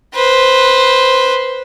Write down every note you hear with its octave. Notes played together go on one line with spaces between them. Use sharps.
B4 C5